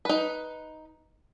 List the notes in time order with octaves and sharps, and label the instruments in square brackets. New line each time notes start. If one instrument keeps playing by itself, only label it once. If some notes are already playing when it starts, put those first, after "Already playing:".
[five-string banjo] D#4 B4